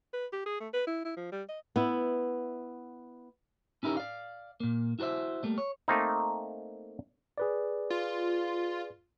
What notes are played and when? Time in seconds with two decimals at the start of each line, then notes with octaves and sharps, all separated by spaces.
0.13 B4
0.33 G4
0.46 G#4
0.60 A3
0.73 B4
0.87 E4
1.05 E4
1.17 F3
1.32 G3
1.49 D#5
1.76 B3 E4
3.83 C#4 D#4 E4 G4 A#4
3.97 D5 F5
4.60 A#2 A#3
4.99 E4 F#4 A4 C5 E5
5.43 G3 A3 A#3
5.58 C#5
5.88 A3 A#3 C4 D#4
7.38 G#4 B4 D5
7.90 F4